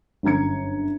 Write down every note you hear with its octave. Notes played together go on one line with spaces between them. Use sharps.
G1 F#2 A#5 G#6 C#7